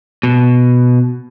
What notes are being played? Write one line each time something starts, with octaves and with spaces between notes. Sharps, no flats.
B2